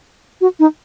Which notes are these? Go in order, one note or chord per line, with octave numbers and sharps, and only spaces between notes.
F#4
D#4